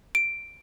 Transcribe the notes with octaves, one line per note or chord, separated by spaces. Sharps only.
D7